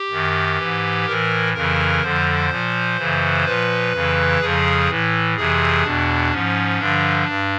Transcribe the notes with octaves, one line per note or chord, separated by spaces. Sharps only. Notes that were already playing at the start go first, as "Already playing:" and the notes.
Already playing: G4
F#2 D#3
G#2 E3
A2 E3 A#4
F2 C#3 E3 A#4
F2 D3 F3 C5
A#2 F3
F#2 C#3 E3
A#2 F3 B4
F2 C#3 E3
F2 C#3 F3 G#4
A2 E3
F2 C3 E3 G#4
E2 B2 D4
G#2 F3 C#4
G2 D3 F3 D4
G2